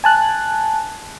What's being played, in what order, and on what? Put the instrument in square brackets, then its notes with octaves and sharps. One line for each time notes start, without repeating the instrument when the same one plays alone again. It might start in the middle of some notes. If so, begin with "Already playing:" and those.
[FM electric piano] G#5 A5 F#6